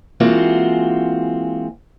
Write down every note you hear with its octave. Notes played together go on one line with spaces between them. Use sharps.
E3 G#3 A#3 C4 F4 F#4